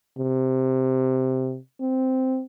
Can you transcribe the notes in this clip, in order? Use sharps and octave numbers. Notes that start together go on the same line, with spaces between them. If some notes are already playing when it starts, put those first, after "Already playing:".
C3
C4